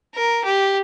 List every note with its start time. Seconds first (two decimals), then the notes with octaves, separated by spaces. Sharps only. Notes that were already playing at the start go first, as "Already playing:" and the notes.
0.15 A#4
0.45 G4